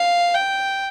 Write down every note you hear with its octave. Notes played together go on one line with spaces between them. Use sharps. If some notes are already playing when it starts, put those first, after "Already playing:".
Already playing: F5
G5